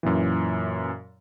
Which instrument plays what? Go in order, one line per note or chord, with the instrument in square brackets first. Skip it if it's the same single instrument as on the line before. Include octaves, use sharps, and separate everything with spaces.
[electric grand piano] F#2 A#2 E3